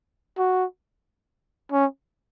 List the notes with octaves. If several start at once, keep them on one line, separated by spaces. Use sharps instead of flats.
F#4
C#4